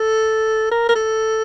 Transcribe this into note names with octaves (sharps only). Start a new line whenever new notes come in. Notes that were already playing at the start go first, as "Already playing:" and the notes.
Already playing: A4
A#4
A#4
A4